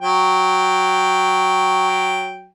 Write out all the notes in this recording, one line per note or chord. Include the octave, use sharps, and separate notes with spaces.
F#3 G5